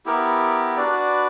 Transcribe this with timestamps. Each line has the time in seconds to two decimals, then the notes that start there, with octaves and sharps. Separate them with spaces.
0.06 B3 E4 G4 A#4
0.77 D4 F#4 B4 D5